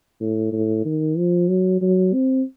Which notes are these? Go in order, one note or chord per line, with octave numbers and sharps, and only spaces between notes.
A2
A2
D#3
F3
F#3
F#3
C4